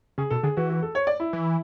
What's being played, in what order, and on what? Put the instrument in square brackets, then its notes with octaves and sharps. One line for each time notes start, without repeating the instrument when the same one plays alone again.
[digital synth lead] C#3 [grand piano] G#4
[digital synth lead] B2 [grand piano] A4
[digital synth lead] D3 [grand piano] G#4
[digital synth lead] E3 [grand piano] F#4
[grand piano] F#4
A4
C#5
D5
E4
[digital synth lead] E3